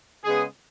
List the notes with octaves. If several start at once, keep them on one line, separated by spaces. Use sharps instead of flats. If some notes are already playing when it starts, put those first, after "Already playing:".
C#3 G#3 B3 G#4